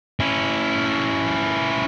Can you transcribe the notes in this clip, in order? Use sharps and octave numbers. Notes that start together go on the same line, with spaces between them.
C#4 E4